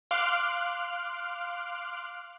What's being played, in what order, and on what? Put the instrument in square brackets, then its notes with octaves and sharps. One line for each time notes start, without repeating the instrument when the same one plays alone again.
[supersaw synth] F5 C6 D6 F6 F#6